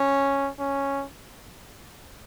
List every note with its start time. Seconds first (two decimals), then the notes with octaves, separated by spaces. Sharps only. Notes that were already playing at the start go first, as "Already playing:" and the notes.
Already playing: C#4
0.60 C#4